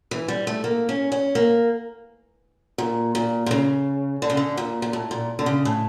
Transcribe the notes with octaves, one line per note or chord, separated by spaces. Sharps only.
E3
G3
A3
A#3
C#4
C#4
A#3
A#2
A#2
A#2
C#3
D3
C#3
D3
A#2
A#2
A2
A#2
D3
C#3
A2